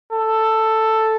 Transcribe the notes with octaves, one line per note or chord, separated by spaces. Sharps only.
A4